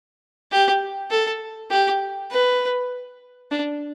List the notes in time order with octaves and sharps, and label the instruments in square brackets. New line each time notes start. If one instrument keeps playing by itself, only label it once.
[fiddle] G4
A4
G4
B4
D4